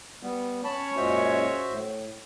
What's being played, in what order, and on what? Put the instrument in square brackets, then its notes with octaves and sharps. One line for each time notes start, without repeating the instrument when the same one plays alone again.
[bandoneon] G3 B3
[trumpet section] C#4 C#5 [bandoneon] A5 B5
[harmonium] F#2 A#2 G#3 [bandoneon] F#4 C5 E5
[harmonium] A2